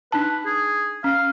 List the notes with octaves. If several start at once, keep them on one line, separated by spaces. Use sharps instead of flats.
D4 D#4 B4 A5
G#4
C#4 F5